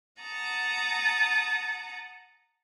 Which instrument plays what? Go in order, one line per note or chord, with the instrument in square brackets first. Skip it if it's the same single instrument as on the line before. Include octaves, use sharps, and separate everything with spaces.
[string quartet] F#5 A5 A#5 D#6